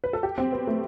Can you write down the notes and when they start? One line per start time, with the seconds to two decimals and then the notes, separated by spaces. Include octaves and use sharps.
0.04 B4
0.13 A4
0.23 G4
0.38 C4
0.52 B3
0.67 A3